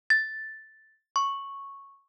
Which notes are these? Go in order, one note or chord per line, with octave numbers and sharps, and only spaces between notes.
A6
C#6